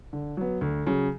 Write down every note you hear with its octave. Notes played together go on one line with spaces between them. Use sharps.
D3
F#3 B3
D2
C#3 F#3